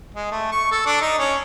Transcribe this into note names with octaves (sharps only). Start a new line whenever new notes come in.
G#3
A3
C#6
A4
D4
D#4
C#4